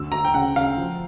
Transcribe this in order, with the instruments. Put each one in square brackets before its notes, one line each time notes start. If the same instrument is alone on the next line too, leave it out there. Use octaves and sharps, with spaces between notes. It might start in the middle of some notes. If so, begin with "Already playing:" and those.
Already playing: [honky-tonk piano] D2 [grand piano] E6
[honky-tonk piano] D2 [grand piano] A#5
[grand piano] G5
[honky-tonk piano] C#3 [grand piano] F#5
[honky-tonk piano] C#3 [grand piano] F5
[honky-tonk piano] F3